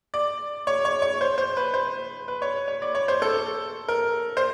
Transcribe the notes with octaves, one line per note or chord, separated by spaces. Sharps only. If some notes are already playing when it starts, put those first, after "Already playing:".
D5
C#5
C#5
C#5
C5
C5
B4
C5
B4
C#5
C#5
D5
C#5
C5
A4
A#4
C5